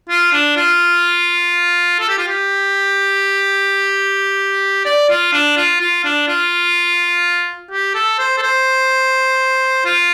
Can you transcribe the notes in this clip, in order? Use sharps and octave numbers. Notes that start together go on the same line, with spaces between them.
F4
D4
F4
A4
G4
F4
G4
D5
F4
D4
F4
F4
D4
F4
G4
A4
C5
A4
C5
F4